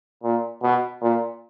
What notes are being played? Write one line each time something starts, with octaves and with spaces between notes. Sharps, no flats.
A#2
B2
A#2